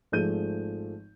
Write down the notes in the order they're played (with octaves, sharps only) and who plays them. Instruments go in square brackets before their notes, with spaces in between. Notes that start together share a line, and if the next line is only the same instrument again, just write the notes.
[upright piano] G#1 F3 A3 G#4 G6 D#7